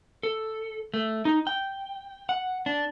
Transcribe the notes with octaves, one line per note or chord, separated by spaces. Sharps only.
A4
A3
D#4
G5
F#5
D4